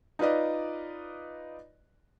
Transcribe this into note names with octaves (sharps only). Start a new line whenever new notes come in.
D#4 F4 B4 D5 D#5